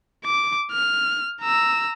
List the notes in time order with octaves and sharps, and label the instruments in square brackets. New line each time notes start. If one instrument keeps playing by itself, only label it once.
[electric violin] D6
F6
A#5 E6